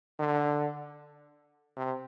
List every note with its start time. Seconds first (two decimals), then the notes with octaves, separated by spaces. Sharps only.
0.19 D3
1.77 C3